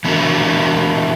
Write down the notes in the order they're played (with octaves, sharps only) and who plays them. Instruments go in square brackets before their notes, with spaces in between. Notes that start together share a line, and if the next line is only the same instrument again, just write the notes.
[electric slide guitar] E3 B3 D4 F#4 A#4